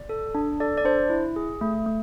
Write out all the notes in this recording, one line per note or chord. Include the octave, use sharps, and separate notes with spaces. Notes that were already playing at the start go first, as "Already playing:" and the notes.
Already playing: D5
A4
D4
A4 D5
D5
D4 C5
E4
G#4
A3
A3